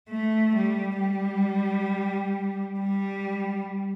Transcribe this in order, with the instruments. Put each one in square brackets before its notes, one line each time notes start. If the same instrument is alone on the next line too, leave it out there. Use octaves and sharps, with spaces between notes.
[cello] A3
G3
G3
G3